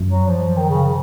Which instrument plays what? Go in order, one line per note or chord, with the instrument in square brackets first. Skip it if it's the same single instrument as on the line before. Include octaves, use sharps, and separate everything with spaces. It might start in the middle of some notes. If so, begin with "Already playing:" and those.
Already playing: [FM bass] F#2
[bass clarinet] F#3
F3
F3
D#3
C#3